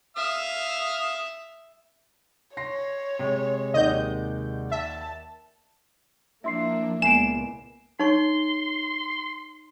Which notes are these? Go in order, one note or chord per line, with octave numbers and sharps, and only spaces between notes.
E5 F5 D#6 F6
C#5 C6 A#6 C7
C3 G#3
D#2 D5 D#5 F#5 G6
E5 A5
F3 A#3 D4 E4 E5 C6 C7
C#2 A#2 B3 G#5 C7 D7 E7
D#4 C#5 C6 C#6